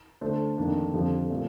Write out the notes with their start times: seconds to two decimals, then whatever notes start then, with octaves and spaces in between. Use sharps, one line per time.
0.21 D3 A3 D4 A4 C5
0.58 F2 D#3 A#3 D4
0.93 F2 D3 F3 C4 G4
1.30 A#2 F3 A3